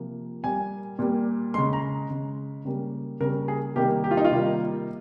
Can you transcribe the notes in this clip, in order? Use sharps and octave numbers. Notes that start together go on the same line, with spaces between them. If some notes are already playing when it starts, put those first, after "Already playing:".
Already playing: C3 F3 A#3
A#2 G3 A#3 G#5
A#2 G3 A#3
C#3 G#3 C6
A#5
C#3 G#3
C#3 G3 A#3
C#3 G3 A#3 A#4
G#4
C3 D#3 G3 A#3 G4
G4
F4
D#4
F4
C3 D#3 G3 A#3